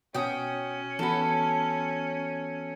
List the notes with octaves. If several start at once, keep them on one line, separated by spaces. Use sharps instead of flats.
B2 C#4 F#4 C#5 G5 D#6
E3 B3 F#4 A4 B5